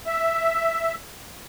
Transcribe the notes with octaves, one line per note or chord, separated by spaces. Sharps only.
E5